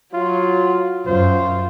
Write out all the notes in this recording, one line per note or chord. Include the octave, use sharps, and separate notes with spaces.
F#3 F4
F#2 F4 C5